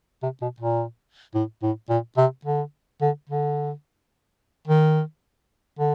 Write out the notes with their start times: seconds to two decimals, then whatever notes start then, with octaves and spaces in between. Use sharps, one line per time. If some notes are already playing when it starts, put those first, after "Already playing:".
0.23 C3
0.42 B2
0.60 A#2
1.34 A2
1.62 A2
1.89 A#2
2.17 C3
2.45 D3
3.02 D3
3.29 D3
4.67 D#3
5.79 D3